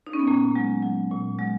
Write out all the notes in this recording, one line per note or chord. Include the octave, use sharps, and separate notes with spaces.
D#4
C#4
B3
A#2 A#3
F#3 G#3
F#3
A#2
F#3 G#3